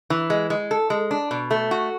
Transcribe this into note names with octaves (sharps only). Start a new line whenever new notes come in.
E3
G#3
G#3
A4
G#3
D4
B2
A3
F#4